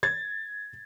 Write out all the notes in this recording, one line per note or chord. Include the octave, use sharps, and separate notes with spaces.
G#6 A6